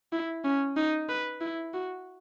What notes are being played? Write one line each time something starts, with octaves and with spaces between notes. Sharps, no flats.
E4
C#4
D#4
B4
E4
F#4